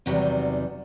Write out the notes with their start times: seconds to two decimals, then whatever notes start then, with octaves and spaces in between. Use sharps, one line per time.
0.06 E2 C3 D#3 F#3 G3